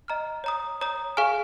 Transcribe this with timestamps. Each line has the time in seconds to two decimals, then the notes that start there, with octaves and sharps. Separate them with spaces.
0.08 D#5 A#5 F6
0.44 C#5 A#5 D#6
0.81 C#5 A#5 D#6
1.17 G#4 F5 G#5 C#6 F6